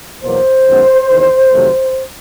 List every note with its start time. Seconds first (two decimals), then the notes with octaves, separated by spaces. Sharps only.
0.23 E2 B2 F#3 A#3 C5
0.67 F#2 D#3 G#3 B3
1.09 E2 C3 D#3
1.53 F2 C3 D#3 F#3 A3